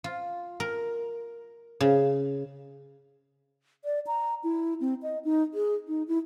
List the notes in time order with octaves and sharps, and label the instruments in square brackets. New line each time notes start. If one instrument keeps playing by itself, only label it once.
[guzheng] F4
A#4
C#3
[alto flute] D5
A#5
E4
C4
D#5
D#4
G#4
D#4
E4